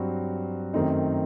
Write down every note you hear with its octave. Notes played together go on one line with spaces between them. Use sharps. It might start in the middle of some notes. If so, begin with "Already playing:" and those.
Already playing: G2 F#3 C4 F#4
F#2 D#3 A3 C4 D#4